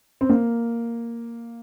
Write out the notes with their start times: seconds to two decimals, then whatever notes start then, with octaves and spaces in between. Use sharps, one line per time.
0.21 C4
0.29 A#3